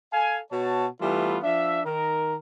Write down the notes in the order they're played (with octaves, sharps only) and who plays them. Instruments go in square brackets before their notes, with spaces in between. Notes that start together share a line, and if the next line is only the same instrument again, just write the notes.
[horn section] A4 F5 G#5
B2 F#4 C#5 A5
E3 G3 A3 B3 F4
F3 D4 E5
D#3 A#4